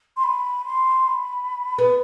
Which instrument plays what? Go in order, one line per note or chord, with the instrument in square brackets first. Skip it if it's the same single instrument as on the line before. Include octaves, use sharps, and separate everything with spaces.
[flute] C6
B5
C6
B5
[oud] B3